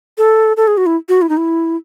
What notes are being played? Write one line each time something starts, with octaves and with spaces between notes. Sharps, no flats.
A4
A4
G#4
F#4
E4
F#4
E4
D#4
E4